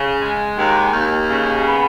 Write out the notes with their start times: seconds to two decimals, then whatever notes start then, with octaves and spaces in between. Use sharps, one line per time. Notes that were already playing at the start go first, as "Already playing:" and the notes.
Already playing: C#3
0.21 G#3
0.57 D#2
0.93 D#2
1.28 C#3
1.65 B3